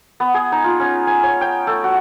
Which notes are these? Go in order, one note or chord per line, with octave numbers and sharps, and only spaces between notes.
B3
G#4
D#4
F4
C#4
G#5
C#5
G5
A3
F#4